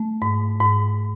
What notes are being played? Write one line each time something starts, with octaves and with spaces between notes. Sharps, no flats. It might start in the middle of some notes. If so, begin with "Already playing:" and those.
Already playing: A3
G#2
G#2